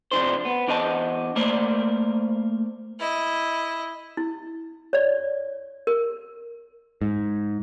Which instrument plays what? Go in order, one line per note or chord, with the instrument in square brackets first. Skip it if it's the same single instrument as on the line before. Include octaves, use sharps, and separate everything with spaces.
[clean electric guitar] C3 F3 D4 C5
B3
E2 D4 C5 D#5 F#5 A5
A3 A#3 A#4 C5 D5
[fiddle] E4 D#5
[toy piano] E4
C#5 D5
A#4
[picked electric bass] G#2